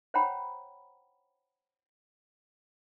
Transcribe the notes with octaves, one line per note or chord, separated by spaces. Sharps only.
C5 C#5 F#5 G5 A#5 B5